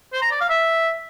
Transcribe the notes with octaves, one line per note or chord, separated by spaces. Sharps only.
C5
A#5
D5
F5
E5